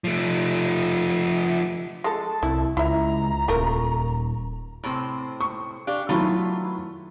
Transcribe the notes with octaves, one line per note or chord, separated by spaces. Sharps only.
F3 A3
G#3 A4 A5
C2 E4
C#2 E4 E5 A#5
D#1 A3 F4 A#4
A2 C3 C4
C#6
D4 G4 F5
D#3 F#3 A3 B3 E4 F4